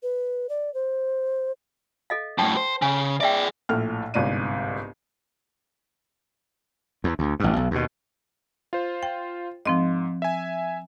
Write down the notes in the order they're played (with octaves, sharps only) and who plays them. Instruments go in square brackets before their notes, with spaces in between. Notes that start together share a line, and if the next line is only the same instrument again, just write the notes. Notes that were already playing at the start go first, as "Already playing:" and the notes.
[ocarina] B4
D5
C5
[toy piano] A4 D#5 F5
[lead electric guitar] F#2 A2 [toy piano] G5 A5
[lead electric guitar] C5
[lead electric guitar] C#3 [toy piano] F5 G#5
[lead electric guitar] G#4 D5 [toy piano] E5 F5 G5
[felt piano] A#1 A2 A4 F6
G1 C2 G#2 D5 D#7
[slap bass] E2
D2
A1 G2
B1
D#2 B2
[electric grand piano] F4 C5
[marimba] G5
[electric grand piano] G#2 [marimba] F3 C4 D#5
[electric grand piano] E5 G#5